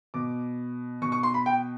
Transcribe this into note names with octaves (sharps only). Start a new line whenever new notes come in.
B2 D6
B2 C#6
C#6
C6
B5
G5